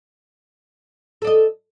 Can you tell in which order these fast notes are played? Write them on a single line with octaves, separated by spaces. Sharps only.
A4 D5 D#5